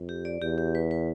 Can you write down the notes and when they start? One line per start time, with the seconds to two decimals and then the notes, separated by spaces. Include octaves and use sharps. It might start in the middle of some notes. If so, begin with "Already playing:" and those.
Already playing: F2
0.09 G4
0.25 D5
0.42 E2 G4
0.58 G4
0.75 B4
0.91 B4